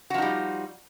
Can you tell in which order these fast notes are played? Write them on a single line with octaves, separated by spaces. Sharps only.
F#4 F3 D#4 G3